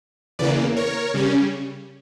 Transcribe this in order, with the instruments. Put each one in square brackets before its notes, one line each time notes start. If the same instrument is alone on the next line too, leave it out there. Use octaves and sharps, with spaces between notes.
[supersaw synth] E2 C#3 E3 A#3 B4 D5
A#4 C#5
C#3 G3 C#4